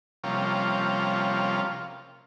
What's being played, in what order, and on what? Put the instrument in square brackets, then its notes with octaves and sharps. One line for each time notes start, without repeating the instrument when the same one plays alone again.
[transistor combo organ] C3 F3 G3 A#3 C#4 F4